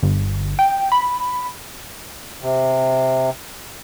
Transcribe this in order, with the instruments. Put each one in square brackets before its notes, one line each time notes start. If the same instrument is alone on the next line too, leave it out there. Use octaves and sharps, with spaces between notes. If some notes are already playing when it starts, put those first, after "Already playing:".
[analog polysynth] G1
G5
B5
[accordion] C3